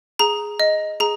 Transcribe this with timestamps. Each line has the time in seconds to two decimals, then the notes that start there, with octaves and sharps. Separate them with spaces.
0.19 G#4 A#5
0.60 D#5
1.00 G#4 A#5